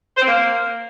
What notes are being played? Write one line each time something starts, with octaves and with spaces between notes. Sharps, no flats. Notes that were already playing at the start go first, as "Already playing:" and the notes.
C5
C4
A#3